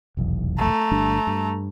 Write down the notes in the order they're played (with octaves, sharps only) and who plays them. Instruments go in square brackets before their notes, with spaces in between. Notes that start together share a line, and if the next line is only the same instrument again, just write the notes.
[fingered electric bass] F1 B1 E2
[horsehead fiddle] A3 A#5
[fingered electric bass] G1 G3 D4
G2